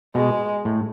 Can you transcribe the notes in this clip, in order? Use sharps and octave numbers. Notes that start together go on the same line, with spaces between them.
B2 G#3
A2